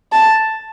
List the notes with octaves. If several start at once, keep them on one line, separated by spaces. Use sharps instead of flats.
A5